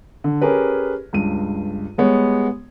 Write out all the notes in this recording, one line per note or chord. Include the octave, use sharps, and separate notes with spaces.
D3
C#4 G4 G#4 A#4 B4
C#2 G2 D#7
G3 G#3 B3 C#5